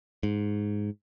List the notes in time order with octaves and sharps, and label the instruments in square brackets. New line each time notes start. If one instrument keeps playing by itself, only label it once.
[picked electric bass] G#2